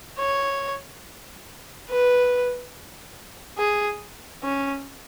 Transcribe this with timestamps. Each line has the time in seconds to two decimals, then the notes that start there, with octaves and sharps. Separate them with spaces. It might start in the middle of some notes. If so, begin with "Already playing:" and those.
0.18 C#5
1.89 B4
3.58 G#4
4.43 C#4